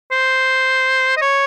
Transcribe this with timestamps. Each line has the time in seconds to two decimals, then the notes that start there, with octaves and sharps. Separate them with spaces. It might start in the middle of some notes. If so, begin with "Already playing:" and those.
0.12 C5
1.17 D#5
1.21 C#5